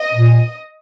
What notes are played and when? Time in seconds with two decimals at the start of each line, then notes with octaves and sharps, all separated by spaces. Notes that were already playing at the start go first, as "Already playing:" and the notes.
Already playing: D#5
0.13 A#2